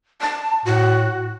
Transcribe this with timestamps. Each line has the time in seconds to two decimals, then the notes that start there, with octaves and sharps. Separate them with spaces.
0.21 A5
0.66 A2 F#4